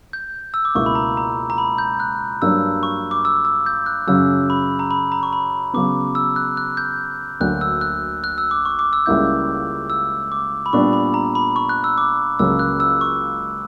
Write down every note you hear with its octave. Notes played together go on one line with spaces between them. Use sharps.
G6
E6
D6
C#2 B2 A#3 E4 C#6
B5
A#5
A#5
A#5
B5
G6
F#6
G2 F#3 A#3 D4 E6
C#6
D6
E6
E6
G6
F#6
F#2 C#3 F#3 C#4 E6
B5
A#5
B5
A#5
C#6
B5
C#3 F#3 B3 D6
E6
F#6
F#6
G6
D2 D3 F#3 A#3 D4 F#6
E6
F#6
F#6
E6
D6
C#6
D6
E6
C#2 C#3 G3 A#3 E4 G6
E6
D6
B5
A#2 G3 B3 D4 C#6
B5
A#5
B5
C#6
F#6
E6
D6
C#2 C#3 F#3 A#3 C#4 E6
F#6
E6
C#6